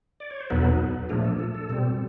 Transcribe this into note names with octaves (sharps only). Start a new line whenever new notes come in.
D5
C#5
C5
E2 B2 F#3 B3 D#4 A4 B4
A#2 F3 A3 D4 G#4 A#4
A4
A4
A4
B2 G3 C4